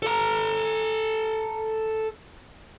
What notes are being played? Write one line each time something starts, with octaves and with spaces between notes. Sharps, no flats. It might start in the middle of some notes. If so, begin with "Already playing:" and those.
A4 A#5